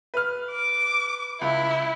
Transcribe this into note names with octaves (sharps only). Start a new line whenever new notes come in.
B4 F6
D6
C#2 E4